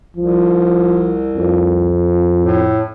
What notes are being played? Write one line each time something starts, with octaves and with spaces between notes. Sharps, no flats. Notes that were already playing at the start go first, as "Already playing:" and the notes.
C2 F3
F2
A2